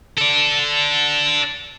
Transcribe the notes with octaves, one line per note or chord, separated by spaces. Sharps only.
A4 D5